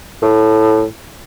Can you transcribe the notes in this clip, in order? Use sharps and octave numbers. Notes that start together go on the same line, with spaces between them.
A2